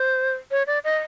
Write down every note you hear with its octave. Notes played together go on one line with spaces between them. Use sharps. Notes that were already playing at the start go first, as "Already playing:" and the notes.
Already playing: C5
C#5
D5
D#5